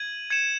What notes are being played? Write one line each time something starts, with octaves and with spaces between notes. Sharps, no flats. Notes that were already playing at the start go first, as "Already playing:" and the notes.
Already playing: G#6 D#7 F#7
G#6 C#7 E7